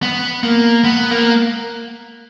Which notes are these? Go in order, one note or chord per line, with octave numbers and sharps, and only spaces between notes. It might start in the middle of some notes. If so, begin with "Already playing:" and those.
B3
A#3
B3
A#3